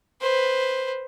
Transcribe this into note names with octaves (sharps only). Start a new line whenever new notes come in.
B4 C5